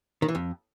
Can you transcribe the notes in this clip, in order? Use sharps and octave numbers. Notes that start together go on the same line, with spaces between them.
D#3
E3
F2